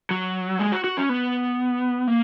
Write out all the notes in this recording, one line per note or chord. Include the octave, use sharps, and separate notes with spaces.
F#3
G#3
F#4
F#4
C#4
B3
A#3